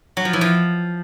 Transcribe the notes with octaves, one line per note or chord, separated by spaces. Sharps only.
F#3
F3
E3
F3